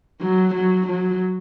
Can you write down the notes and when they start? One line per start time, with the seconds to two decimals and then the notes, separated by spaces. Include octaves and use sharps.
0.22 F#3
0.54 F#3
0.87 F#3